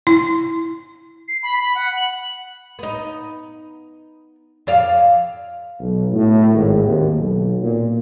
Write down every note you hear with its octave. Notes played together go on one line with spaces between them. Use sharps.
E4
C7
B5
B5
F#5
F#7
B3 D#4
F2 D5 F5
B1
A2
G#1
D#2
B1
A#2